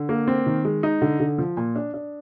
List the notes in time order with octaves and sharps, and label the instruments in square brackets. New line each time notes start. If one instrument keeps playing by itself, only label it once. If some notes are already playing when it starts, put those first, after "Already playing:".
Already playing: [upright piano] D3
A#3
C4
D#3
G#3
D#4
D3
D3
F3
A#2
D4
D4